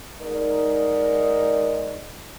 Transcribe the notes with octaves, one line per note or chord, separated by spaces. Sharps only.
G#2 D#4 A#4 D5